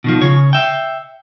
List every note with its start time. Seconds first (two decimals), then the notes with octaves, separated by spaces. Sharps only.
0.04 B2 D#3 F3
0.21 C#3 C#5
0.53 E5 G5